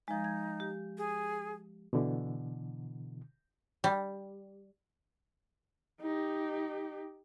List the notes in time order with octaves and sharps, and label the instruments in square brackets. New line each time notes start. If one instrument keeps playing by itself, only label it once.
[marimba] F3 G#3 [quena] D#4
[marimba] G#6
G4
[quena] G#4
[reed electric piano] B2 D3 E3
[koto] G3
[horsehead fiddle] D#4 G4